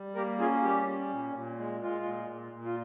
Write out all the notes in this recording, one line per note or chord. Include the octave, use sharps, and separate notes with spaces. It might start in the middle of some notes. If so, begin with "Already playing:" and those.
Already playing: G3
A#3 G4 A#4
C#4 F4 G#4
G3 G4
C#4
A#2
A#2
G#3
G#3 F4
A#2
A#2
A#2
F4